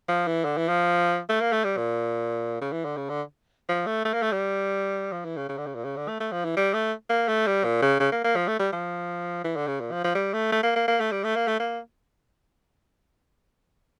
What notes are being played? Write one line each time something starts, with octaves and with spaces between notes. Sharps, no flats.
F3
E3
D3
E3
F3
A3
A#3
A3
G3
A#2
C#3
E3
D3
C#3
D3
F3
A3
A3
A#3
A3
G3
F3
E3
C#3
C#3
D3
C#3
A#2
C#3
D3
A3
A3
F3
E3
G3
A3
A#3
A3
G3
A#2
C#3
C#3
A#3
A#3
F3
A3
G3
F3
E3
D3
C#3
A#2
F3
F3
G3
A3
A3
A#3
A#3
A#3
A3
G3
A3
A#3
A3
A#3